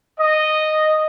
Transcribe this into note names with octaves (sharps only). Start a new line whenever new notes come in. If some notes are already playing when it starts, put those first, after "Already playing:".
D#5